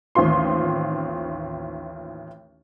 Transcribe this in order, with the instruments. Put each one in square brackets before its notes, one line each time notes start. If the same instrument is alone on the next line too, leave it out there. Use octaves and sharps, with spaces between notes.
[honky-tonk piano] A1 D#2 C4 F4 C6